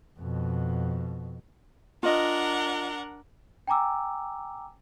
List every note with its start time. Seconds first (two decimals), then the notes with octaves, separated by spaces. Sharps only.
0.20 F2 B2
2.03 D4 F4 A#4 D#5 F#5
3.67 G5 G#5 A#5 D6 E6